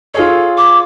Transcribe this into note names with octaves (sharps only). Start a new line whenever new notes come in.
F4 G#4 A4 C#5
D6